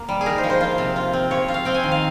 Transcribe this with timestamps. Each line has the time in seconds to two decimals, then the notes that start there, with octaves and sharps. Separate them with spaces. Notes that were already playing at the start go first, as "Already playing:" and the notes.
Already playing: A#3
0.09 G3
0.21 G#4
0.26 D#4 A#4
0.38 C5
0.44 F3
0.50 C5
0.61 F4
0.78 C3
0.96 F4
1.13 C4
1.31 F3 C#5
1.48 F4
1.54 F5
1.65 C4 G5
1.74 G#5
1.84 D#3
1.92 F5